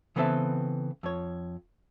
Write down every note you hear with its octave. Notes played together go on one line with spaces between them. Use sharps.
C#3 E3 B3 C4 A4 E5
F2 C#5